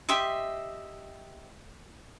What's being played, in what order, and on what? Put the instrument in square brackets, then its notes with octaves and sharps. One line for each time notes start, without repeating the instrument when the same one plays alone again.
[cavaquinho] G4 D#5 E5 C6